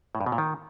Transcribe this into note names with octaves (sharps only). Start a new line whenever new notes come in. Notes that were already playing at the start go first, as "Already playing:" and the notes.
A2
G2
B2
A#2
D#3